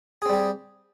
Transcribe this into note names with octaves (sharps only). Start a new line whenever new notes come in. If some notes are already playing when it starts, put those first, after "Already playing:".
G3 C4 G4 G#4